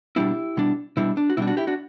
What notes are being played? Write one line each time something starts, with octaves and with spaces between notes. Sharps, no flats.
B2 G3 D4 E4 G4
B2 G3 D4
B2 G3 D4 E4
D4
F#4
B2 G3 D4 E4
D4 F#4
E4 G4
D4 F#4